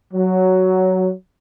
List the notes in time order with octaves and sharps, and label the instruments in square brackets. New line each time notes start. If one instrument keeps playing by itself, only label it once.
[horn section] F#3